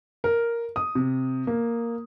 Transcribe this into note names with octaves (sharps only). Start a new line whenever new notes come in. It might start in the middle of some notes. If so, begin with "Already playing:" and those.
A#4
D#6
C3
A#3